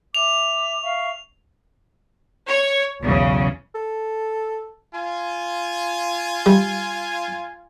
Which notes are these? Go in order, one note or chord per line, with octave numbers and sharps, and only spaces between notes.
E5 D6 F7
E5 F5 C#6
C#5
B1 E2 C#3
A4
F4 G#5
G3